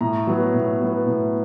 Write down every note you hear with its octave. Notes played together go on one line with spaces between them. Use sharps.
A2 A#5
F#3 B3
A2
F#3 B3
A2